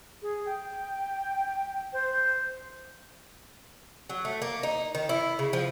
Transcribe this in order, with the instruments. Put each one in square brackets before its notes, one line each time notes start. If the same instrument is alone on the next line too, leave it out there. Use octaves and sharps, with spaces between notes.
[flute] G#4
G5
C5
[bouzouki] F#3
A3
A#3
D#4
D#3
E4
C#3
F3